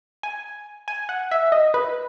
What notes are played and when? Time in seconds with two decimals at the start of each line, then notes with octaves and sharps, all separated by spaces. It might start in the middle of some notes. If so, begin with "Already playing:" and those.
0.23 G#5
0.88 G#5
1.09 F#5
1.31 E5
1.52 D#5
1.74 B4